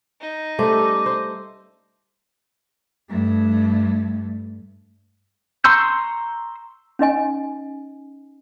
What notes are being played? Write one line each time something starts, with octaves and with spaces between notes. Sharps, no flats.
D#4
G3 A3 C#4 A4 C5 D6
C5
G2 A3
A#5 C6 C#6 E6 G6
C#4 D#4 D#5 G#5